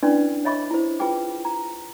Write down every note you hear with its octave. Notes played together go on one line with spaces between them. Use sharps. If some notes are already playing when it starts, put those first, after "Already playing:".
C#4 D4 E4 B4 D5 C6
C#5 D#5 E5 B5 C#6 D6
E4 C5
F4 G#4 B4 G5 D6
A#5